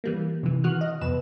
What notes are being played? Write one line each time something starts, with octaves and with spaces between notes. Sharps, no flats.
E3 G3 A#3
C3 E3
D#3 E3 F#4 F6 F#6
D#5
C2 F2 B2 B4 E7